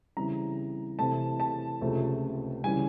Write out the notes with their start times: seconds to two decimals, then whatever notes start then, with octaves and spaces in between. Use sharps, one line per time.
0.17 C#3 E3 G3 C4 E4 A#5
0.99 C3 E3 A3 C4 A5
1.40 A5
1.81 C#2 C3 F3 A3 C#4
2.64 C#3 E3 G3 G#5